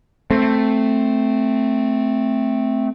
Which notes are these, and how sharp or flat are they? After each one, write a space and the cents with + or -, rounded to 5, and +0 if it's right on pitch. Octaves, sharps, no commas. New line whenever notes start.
A3 +0 C4 +0